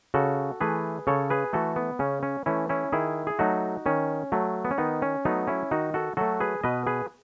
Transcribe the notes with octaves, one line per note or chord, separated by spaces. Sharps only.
C#3 F#4 A4
E3 A3 G#4 B4
C#3 A4 C#5
G#4 B4
E3 A3 F#4 A4
B3
C#3 C#4
C#4
E3 A3 C#4 E4
C#4 E4
D#3 E4 G#4
G#4
F#3 A3 D#4 F#4
D#3 C#4
F#3 A3
B3
C#4
D#3 B3 D#4
C#4
F#3 A3 B3 D#4
C#4 E4
D#3 D#4 F#4
F#4 A4
F#3 A3 F#4 A4
G#4 B4
B2 B4 D#5
G#4 B4